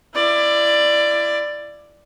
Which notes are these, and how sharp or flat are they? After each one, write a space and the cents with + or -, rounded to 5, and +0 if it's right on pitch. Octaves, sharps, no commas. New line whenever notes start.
E4 +30 D5 +10